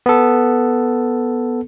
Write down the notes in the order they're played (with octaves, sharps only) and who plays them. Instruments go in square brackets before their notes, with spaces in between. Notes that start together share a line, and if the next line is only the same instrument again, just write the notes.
[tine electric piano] B3 A4